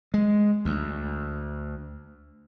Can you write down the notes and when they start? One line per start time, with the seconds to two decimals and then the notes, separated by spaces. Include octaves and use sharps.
0.14 G#3
0.65 D2